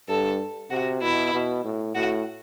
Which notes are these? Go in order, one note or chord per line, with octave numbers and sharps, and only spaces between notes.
G2 A4
C3 F#4
B2 E4
B2
A2
A2 F#4